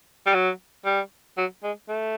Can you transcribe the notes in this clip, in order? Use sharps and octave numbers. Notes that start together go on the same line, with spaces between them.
G3
F#3
G3
F#3
G#3
A3